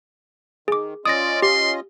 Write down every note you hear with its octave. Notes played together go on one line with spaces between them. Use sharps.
D#3 G#4 D6
C#4 F4 D5 D#5 D#6 A#6
G4 C6